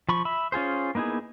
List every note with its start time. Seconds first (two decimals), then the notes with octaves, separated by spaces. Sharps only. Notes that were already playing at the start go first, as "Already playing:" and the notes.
0.09 F3 B5 C#6
0.25 E5 B5
0.52 C#4 F4 G#4 C5
0.95 A#3 B3 D#4 E4 G#4